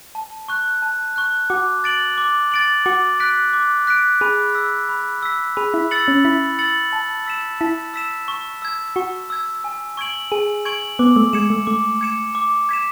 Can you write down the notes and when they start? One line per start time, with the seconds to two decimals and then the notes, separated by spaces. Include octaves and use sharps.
0.15 A5
0.48 C#6 F#6
0.82 A5
1.16 C#6 F#6
1.50 F#4 D6
1.84 A6 D7 F#7
2.18 D6
2.52 A6 D7 F#7
2.86 F#4 D6
3.20 F#6 B6 D7
3.53 D6
3.87 F#6 B6 D7
4.21 G#4 B5
4.55 E6 B6
4.89 B5
5.23 E6 B6
5.57 G#4 B5
5.74 E4
5.91 E6 A6 C#7 F#7
6.08 C#4
6.25 E4 B5
6.59 E6 A6 C#7 F#7
6.93 A5
7.26 E6 B6 E7
7.60 E4 A5
7.94 E6 B6 E7
8.28 C#6
8.62 E6 G#6
8.96 F#4 C#6
9.30 E6 G#6
9.64 G#5
9.97 C#6 G#6 D7 F#7
10.32 G#4 G#5
10.65 C#6 G#6 D7 F#7
10.99 B3 D6
11.16 A3
11.33 G#3 G#6 C#7 E7
11.50 A3
11.67 A3 D6
12.01 G#6 C#7 E7
12.35 D6
12.69 G#6 B6 E7